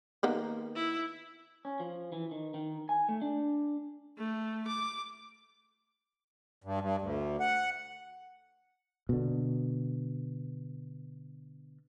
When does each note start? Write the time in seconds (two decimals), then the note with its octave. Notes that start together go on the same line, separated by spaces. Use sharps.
0.23 D#3 A#3 B3
0.75 E4
1.65 C#4
1.80 F3
2.12 E3
2.31 D#3
2.54 D#3
2.89 G#5
3.09 A3
3.22 D4
4.18 A3
4.67 D6
6.64 G2
6.81 G2
7.01 D2
7.40 F#5
9.09 B2 D3